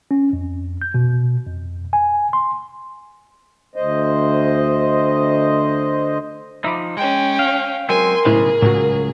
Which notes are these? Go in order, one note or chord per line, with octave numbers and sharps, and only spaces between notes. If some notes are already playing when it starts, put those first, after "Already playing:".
C#4
F2
G6
B2
F2
G#5
C6
D2 C5 D#5
F3 D#4 E5 B5 D6
G#3 C#4 G5
F5
F#3 G#3 C4 A#4 G#5 C6
B1 A2 C#3 G#3 E4 G#4 C5
C#2 A2 F#3 F#4